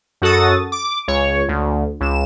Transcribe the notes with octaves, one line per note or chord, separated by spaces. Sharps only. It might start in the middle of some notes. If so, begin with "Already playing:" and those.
F#2 F#4 A4 D#6 A6
D6
C#2 C#5
D2
C#2 E7